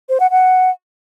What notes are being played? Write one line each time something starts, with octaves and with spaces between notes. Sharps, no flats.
C5
F#5
F#5